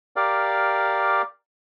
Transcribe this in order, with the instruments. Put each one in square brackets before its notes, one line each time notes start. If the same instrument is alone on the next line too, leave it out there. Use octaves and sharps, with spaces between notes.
[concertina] G4 A#4 D5 F5